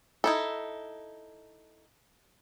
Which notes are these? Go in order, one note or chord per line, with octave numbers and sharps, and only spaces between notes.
D#4 E4 A4